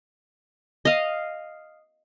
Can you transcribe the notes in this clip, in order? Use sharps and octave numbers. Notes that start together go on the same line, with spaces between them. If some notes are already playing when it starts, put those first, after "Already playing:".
D#5 F5